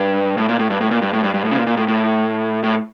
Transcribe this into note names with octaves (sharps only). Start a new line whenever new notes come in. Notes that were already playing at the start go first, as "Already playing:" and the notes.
Already playing: G2
A2
A#2
A2
G2
A2
A#2
G2
A2
G2
G2
A2
C#3
A#2
A#2
A2
A2
A2